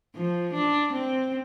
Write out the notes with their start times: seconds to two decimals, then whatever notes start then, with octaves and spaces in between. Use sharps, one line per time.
0.16 F3
0.54 D4
0.93 C4